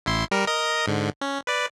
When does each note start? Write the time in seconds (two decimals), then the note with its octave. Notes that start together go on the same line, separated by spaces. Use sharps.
0.06 A1 E4 C6
0.31 G3 A#4
0.47 A#4 D#5 D#6
0.87 G#2 D3
1.21 C#4
1.47 B4 D5